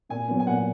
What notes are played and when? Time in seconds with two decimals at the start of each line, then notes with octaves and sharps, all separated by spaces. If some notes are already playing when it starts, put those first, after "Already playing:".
0.09 A#2 G#5
0.28 F#3 B3
0.40 G#5
0.47 A#2 F#5